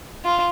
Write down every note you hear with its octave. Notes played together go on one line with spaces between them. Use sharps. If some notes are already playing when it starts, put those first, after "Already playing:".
F4